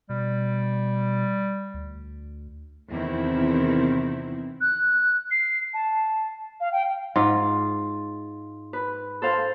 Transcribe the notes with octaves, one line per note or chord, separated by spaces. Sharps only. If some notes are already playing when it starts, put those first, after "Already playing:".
B2 G3
D2
E2 C3 D#3 C4 E4
F#6
C7
A5
F5
G5
G#2 F4
B4
A4 C5 F5